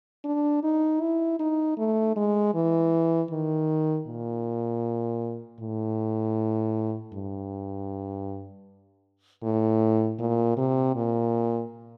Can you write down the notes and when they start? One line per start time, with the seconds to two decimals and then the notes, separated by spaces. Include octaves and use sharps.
0.24 D4
0.63 D#4
1.01 E4
1.39 D#4
1.78 A3
2.16 G#3
2.54 E3
3.31 D#3
4.07 A#2
5.60 A2
7.13 G2
9.43 A2
10.19 A#2
10.57 C3
10.95 A#2